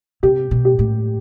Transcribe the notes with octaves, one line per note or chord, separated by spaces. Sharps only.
C3 G4
B2
G4
A2